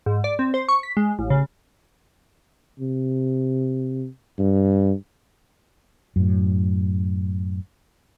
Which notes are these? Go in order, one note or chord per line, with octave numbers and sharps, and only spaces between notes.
G#2
D5
C4
C5
C#6
B6
G#3
A1
C#3
C3
G2
F#2 A2